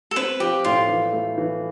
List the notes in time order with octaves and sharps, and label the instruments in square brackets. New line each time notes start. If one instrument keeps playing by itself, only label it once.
[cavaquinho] A4
[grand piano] C4 [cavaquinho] B4
[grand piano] F3 [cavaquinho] G4
[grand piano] A2 [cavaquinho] F4
[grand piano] E3
A3
E3